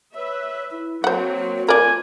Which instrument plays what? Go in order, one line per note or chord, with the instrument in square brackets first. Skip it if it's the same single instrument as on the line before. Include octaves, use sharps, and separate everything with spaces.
[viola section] B4 E5 [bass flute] C#5
[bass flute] E4
[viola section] F#3 A#3 C4 [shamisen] C5 F#5 [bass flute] C#5
[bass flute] F4 [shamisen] A#4 D5 [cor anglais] G#5